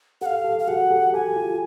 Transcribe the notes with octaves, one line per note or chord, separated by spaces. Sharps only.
G4 A4 F5 F#5
G4 A4
F5
F#4 G#4 F#5
G4 A4
G4 A4 G#5
F4 G4